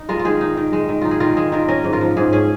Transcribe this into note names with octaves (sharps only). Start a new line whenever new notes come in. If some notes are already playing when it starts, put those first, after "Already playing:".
Already playing: D#4
G#3 F4 A#4
F4
D#3 G#4
D#4
D#3
G#3
D#3
D#4 F4
G#4
D#3 F4 A#4
G#3 G#4
D#3 F4 A#4
C#4 A#4 D#5
G#2
F4 A#4
F3
G#2 G#4
C#4 G#4